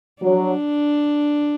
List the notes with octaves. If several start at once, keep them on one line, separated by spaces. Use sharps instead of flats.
F#3 D4